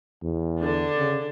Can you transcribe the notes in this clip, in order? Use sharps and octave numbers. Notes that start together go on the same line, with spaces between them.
E2
D3 D4
C#3